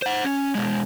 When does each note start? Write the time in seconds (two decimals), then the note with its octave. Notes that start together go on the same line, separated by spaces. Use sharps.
0.02 C5 F#5
0.25 C#4
0.55 B2 G#3